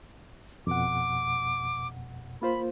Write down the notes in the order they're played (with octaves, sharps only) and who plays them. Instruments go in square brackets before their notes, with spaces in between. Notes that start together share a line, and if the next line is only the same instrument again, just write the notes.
[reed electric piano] F2 B2 F#5 [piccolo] D6
[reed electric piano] A#3 F4 C5 [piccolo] B5